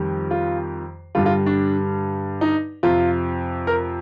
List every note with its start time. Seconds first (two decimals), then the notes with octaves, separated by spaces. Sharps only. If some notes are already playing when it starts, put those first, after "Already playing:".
Already playing: F2 D#3 G3
0.31 F4
1.15 G2 D3 G3 F4
1.26 F4
1.46 D4
2.41 D#4
2.83 F2 C3 F3 F4
3.67 A#4